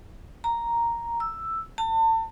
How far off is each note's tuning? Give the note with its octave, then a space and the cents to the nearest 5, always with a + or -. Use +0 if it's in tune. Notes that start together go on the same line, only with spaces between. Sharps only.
A#5 +0
E6 +5
A5 +35